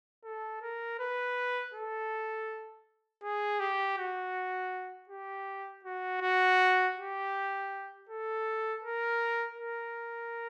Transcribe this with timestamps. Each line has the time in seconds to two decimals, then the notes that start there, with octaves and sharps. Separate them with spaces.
0.24 A4
0.62 A#4
0.99 B4
1.74 A4
3.23 G#4
3.60 G4
3.98 F#4
5.09 G4
5.84 F#4
6.21 F#4
6.97 G4
8.09 A4
8.82 A#4
9.58 A#4